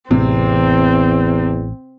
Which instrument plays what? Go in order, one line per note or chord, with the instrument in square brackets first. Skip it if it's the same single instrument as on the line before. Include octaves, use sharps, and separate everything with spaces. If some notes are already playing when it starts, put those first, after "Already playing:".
[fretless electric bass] A1 [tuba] E2 [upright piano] C3 [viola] C4